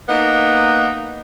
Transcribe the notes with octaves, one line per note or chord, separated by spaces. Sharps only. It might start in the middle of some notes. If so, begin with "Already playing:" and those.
A#3 B3 D#4